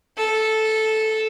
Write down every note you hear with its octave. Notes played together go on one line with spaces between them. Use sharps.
A4